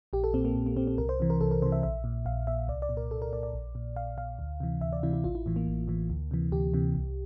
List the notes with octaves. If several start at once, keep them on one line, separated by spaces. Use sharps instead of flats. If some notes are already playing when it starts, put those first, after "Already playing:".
A#1 G4
A4
A#2 C4
A#3
A#1
A#3
A#2 C4
C4
C2 A#4
C5
C3 E3
A#4
C2 A4
A#4
C3 E3 C5
E5
A#1 E5
A#2
A#1 F5
A#2 E5
C2 D5
D5
A#2
A#4
C2 A4
A#4
A#2 D5
D5
A#1
A#2
A#1 F5
A#2 F5
D2
C3 E3
D2 E5
D5
C3 E3 E4
E4
A1 F4
E4
A2 E3
A#3
A1
A2 E3
D2
C3 E3
D2 G4
C3 E3
C2